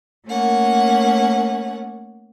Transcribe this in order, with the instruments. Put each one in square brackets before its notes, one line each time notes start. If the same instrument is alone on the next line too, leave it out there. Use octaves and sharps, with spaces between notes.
[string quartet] A3 A#3 C#4 F#5